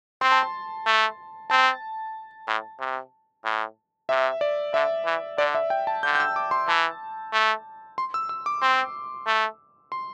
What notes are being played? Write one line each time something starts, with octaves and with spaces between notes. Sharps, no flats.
C4 C6
A5
C6
A3
C4 A5
A2
C3
A2
C3 E5
D5
D3 E5
E3
D3 D5
E5
G5
A5
D3 G6
G6
E6
D6
C6
E3 A5
A3
C6
E6
E6
D6
C4 C6
A3
C6